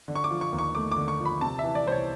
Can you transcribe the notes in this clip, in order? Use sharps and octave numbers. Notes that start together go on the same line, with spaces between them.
D3
C#6
D6
F3
C#6
D#2
C#6
A3 D6
D3 D6
C#6
F3
B5
C3 A5
E3 E5
D5
C2 C5
C#5